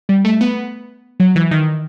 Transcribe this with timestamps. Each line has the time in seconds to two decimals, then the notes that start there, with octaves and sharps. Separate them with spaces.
0.09 G3
0.25 A3
0.41 B3
1.20 F#3
1.36 E3
1.51 D#3